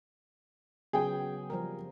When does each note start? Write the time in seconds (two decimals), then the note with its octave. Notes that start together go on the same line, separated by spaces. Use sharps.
0.93 C#3 F#3 B3 G#4 G5
1.50 F3 G3 A#4